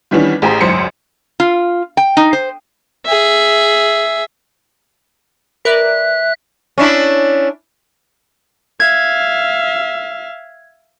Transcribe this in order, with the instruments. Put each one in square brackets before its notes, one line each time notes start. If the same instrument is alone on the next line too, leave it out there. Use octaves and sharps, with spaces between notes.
[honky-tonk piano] D#3 E3 G3 B3 C#4 D4
A1 G4 G#4 C5 A#5
G#1 C#2 F#2 C5 C#7
[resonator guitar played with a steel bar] F4
G5
D#4
C5
[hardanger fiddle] G#4 E5
[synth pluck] A#4 B4 D5 [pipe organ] E5 F#6
[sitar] C#4 D4 E4
[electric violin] E5 F5 [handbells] G#6